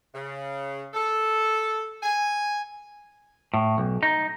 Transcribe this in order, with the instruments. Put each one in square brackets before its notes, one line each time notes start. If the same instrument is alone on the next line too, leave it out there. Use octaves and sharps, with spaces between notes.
[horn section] C#3
A4
G#5
[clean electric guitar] A2
B1
D#4